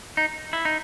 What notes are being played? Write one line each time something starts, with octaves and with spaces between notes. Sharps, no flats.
D#4
E4
D#4